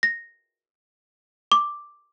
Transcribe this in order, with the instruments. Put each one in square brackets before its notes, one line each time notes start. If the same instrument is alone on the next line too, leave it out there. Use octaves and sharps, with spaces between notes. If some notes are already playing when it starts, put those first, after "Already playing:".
[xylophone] A#6
D6